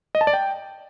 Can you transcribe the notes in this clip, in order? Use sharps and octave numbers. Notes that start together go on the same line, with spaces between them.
D#5
A5
D5
G5